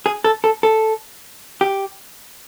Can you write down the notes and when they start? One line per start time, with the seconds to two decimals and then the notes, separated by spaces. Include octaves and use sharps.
0.06 G#4
0.24 A4
0.44 A4
0.63 A4
1.61 G4